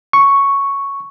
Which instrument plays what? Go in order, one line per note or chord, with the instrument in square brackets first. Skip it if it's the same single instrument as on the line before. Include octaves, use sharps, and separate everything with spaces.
[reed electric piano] C#6